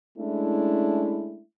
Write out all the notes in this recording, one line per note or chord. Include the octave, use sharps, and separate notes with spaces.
G#3 A3 C#4 D4 E4